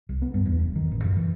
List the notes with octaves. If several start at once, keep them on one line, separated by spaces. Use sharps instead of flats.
C2
B3
G2
E2
F1
D#3
A1
F#2
E3